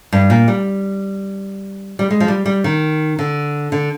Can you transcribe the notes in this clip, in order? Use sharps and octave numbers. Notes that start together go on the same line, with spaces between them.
G2
A#2
G3
G3
G#3
F3
G3
G3
D#3
D3
D3